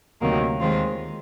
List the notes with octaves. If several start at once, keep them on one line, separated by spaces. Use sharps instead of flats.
D2 C3 D#3 F#3 A#3
D#2 D#3 G#3 C4 F4